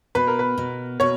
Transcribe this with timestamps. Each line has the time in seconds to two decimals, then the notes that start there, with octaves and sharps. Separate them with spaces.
0.15 B2 B4
0.27 A#4
0.39 B4
0.58 B2
1.00 B2 C#5